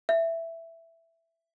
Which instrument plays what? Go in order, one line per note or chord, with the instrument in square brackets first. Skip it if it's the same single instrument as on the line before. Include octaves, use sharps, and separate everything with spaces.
[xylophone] E5